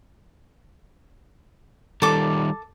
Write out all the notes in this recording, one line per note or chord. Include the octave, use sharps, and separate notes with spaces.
D#3 G3 A4 D6